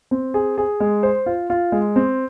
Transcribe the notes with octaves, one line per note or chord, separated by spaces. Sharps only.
C4
G#4
G#4
G#3
C5
F4
F4
G#3
C4